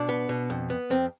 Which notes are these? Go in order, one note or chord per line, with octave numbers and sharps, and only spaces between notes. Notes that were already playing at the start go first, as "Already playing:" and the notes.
Already playing: B2 D4
B3
B2
F2
B3
F2 C4